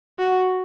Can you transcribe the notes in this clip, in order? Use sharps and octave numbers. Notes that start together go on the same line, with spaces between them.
F#4